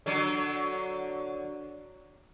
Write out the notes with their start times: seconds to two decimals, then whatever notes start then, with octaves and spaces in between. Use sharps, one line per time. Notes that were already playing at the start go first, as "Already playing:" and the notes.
0.06 D3 F#3